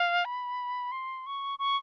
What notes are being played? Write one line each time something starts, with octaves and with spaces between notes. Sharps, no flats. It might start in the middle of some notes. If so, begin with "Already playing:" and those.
Already playing: F5
B5
C6
C#6
C#6